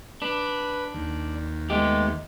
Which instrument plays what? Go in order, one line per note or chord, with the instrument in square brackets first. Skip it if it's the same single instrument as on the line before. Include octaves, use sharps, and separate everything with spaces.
[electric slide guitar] D4 [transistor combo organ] B4
[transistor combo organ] D#2
[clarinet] G#3 [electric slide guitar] A3 B3 G4